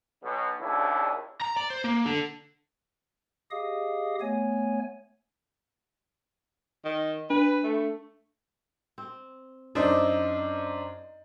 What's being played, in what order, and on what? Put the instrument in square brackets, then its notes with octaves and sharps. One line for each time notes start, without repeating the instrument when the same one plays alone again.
[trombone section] B1 B2
A#1 D#2 C#3 D4 E4
[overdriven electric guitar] A#5
D5
C5
A#3
D3
[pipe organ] G4 G#4 D#5 F5 D#6
A3 B3 C#5 G#5
[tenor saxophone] D#3
[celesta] D4 [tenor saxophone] B4
[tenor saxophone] A3
[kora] C4
[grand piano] F#2 D4 C5 [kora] D#4 D5 E5